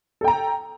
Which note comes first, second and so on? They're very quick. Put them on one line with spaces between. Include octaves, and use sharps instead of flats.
A4 G5 A#5